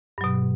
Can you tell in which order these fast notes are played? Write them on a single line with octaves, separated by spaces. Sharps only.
G2 F#3 B2